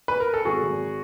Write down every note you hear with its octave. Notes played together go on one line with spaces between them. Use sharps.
B4
A#4
A4
G#1 F#4 G#4
G#1